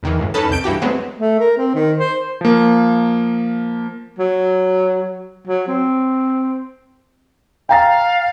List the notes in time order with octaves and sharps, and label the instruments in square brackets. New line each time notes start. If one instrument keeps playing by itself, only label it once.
[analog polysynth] E2 D#3 E3
C#2 F#2 A2
C#4 D#4 A4 B4 A5
C2 F2 G6 D7
G2 E3 F#4 G4
F#3 G#3 A3 B3 C4
[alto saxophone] A3
A#4
C4
D#3
C5
[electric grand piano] F3 A#3
[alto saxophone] F#3
F#3
C4
[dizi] F5 [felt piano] G5 A#5 A6